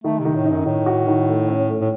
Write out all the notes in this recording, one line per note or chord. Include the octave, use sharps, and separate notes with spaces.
D#3 A3
C3
D#3
A2
D#4
F#2
A2 D#3
F#4
D#3
A3
C#4
A3
A2